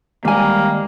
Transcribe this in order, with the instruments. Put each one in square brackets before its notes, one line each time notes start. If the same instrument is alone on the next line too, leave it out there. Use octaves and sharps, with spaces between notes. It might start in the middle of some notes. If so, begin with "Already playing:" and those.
[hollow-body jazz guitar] D#2 G#5 [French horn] G3 [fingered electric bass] G#3 [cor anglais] A#3